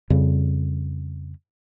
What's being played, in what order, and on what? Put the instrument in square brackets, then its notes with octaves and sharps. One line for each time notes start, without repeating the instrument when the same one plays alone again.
[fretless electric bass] F2 C#3 G3